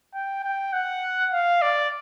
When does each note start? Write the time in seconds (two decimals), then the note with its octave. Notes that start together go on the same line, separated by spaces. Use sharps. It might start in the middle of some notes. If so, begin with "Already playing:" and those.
0.14 G5
0.43 G5
0.73 F#5
1.33 F5
1.62 D5